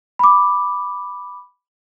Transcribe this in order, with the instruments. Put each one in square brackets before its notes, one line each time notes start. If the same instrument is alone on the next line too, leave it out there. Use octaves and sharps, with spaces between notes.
[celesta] B5 D6